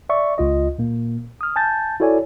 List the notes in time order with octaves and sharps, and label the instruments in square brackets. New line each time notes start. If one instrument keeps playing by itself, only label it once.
[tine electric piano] D5 E5 C#6
C#2 F4 D#5
A#2 A#3
D#6 F6
G#5 A5 G6 A6
E4 F#4 A4 C#5 D5 G#5